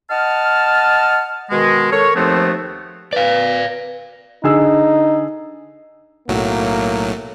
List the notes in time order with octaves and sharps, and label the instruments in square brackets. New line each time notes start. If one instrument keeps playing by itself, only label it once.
[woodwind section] D#5 F#5 A5 F6
B2 D#3 G#3
A4 A#4 C#5
D#2 F3 A3 B3 C4
[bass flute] B4 [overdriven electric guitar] D5 F5
[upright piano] D3 G#4 E6 [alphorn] D#4
[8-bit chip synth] B1 A2 F#3 [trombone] A#3